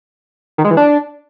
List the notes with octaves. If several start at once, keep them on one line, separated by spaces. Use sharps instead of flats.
D#3
G#3
E3
D4